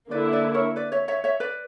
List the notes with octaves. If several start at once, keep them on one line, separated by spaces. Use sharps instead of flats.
D3 A#3 E4 B4 D5
B4 D5
A#4 C#5
B4 D5
C#5 E5
C#5 E5
C#5 E5
B4 D5